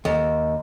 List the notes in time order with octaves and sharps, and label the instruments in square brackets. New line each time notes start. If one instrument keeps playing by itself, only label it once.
[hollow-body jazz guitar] D#2